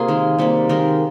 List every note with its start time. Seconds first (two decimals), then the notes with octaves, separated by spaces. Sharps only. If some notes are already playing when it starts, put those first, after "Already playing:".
Already playing: C3 A#3 F4 G#4
0.08 D#3 G#3
0.39 C3 G3 A#3
0.69 D#3 G#3 A#4